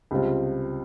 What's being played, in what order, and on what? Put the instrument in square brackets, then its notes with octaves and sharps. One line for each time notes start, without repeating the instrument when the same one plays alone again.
[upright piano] C#2 C3 G3 C4 F4